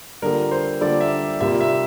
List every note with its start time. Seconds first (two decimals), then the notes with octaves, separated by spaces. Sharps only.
0.22 D3 G3 A#3 F4 A4 A#4
0.51 C5
0.81 D3 G3 A#3 F4 A4 D5
1.01 E5
1.40 C2 C3 G3 A#3 F4 E5
1.61 E5